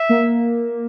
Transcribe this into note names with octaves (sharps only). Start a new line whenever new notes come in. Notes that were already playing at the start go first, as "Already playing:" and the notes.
Already playing: E5
A#3